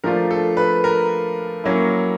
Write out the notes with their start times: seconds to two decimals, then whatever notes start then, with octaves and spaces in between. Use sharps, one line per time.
0.04 F3 A3 D4 F4 A#4
0.31 A4
0.57 B4
0.84 A#4
1.64 F#3 A#3 C#4 E4